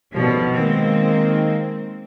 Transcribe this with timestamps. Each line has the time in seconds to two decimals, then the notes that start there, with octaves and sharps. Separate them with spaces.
0.13 A1 D#2 B2 F3 G3
0.55 D#3 G#3 A#3 C4